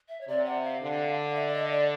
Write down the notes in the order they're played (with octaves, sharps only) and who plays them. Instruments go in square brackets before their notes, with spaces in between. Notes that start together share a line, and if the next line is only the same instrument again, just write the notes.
[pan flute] E5
C#5
[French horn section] C3 [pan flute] D5
[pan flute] F#5
F5
[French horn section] D3
[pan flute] E5
D5
D#5
D5